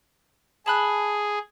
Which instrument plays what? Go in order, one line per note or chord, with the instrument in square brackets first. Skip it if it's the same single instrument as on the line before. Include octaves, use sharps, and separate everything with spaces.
[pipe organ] G#4 [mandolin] A5 B5 F#6